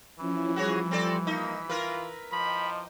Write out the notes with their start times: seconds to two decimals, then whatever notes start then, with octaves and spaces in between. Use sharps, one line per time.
0.19 E3 F3 C#4 E4
0.56 F3 G3 F#4 G#4 C#5
0.91 C4 A4 D5
1.27 A#3 D#4 B6
1.69 E4 F4 A#4 B4
2.32 F3 D#5 G5 B5 D6